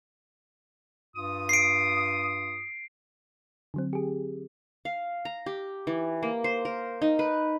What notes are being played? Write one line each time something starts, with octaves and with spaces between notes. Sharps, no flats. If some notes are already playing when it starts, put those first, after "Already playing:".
G2 F4 D#6
C7 D7
D3 F#3 C4
G4 G#4
F5
A#5
G4
E3
A#3
C5
A#4
D#4
B4